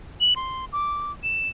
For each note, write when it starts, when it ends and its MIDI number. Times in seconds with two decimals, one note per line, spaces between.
0.21 0.34 102
0.36 0.65 84
0.73 1.12 86
1.23 1.49 100